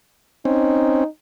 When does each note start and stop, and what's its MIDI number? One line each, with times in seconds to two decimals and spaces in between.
0.45 1.04 60
0.45 1.04 61
0.45 1.07 63